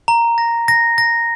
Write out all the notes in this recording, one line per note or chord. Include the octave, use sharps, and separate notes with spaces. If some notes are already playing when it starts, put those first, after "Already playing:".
A#5
A#6
A#6
A#6